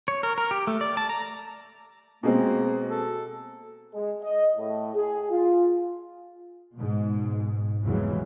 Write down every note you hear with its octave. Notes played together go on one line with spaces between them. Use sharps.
C#5
A#4
A#4
G4
A3
D5
A5
A#5
B2 G#3 A#3 C4
A4
G#3
D#5
A2
G#4
F4
G#2 B2
F1 E2 C#3 E3 F#3 G#3